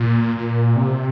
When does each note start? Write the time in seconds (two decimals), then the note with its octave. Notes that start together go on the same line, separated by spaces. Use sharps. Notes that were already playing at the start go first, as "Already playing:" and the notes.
Already playing: A#2
0.37 A#2
0.76 C3